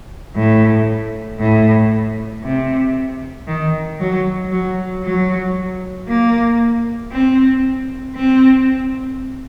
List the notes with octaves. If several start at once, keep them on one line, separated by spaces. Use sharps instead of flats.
A2
A2
C3
D#3
F#3
F#3
F#3
A#3
C4
C4